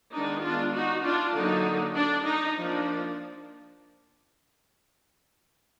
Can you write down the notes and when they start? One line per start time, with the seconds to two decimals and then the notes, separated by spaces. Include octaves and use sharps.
0.13 D#3 G#3 B3 D4 D#4
0.43 D4 F4
0.73 D#4 F#4
1.04 D4 F4
1.35 D3 F#3 A#3 D4 D#4
1.95 D4
2.26 D#4
2.56 F3 A#3 D4